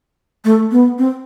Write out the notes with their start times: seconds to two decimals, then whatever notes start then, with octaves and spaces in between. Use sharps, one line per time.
0.45 A3
0.71 B3
0.98 C4